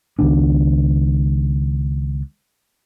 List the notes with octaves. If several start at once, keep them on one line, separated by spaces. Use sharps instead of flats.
C#2 D#3 B3 D4